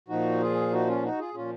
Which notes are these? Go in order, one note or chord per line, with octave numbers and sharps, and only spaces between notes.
A#2 F3 D#4 F#4
F4 G#4
D#4 F#4
C#4 F4
D#4 F#4
F4 G#4
A#2 F3 C#4 F4